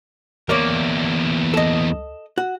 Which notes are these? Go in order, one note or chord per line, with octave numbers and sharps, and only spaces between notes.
E2 A#3 A#4 C#5 D5
A4 D#5
F#4